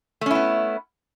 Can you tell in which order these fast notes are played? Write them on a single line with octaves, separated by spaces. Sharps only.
A3 C#4 E4 B3